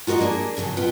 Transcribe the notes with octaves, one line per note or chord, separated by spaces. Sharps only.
F4 F#4 A#4 D5 D#5
A#3 D4 G#4
A2 C#3 E3 F#3
B2 F4 B4 G5